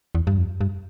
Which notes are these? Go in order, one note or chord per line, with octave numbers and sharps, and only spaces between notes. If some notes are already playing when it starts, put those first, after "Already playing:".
E2
G2
F2
G2